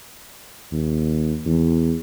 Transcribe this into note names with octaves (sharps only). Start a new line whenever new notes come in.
D#2
E2